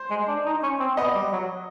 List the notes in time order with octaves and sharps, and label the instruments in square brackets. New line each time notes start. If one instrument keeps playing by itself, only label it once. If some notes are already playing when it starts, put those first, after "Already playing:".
Already playing: [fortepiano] C5
[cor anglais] G#3
D4
D#4
C#4
C4
[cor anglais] B3 [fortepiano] D#5
[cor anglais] G3
F#3